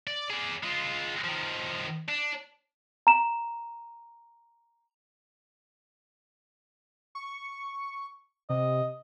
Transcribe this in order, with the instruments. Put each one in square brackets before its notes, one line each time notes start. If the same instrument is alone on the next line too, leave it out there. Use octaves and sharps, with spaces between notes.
[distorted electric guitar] D5
G#4 D5
G#3 F4
D#3 F3
D4
[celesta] A#5 E7
[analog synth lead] C#6
[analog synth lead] C3 [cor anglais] D#5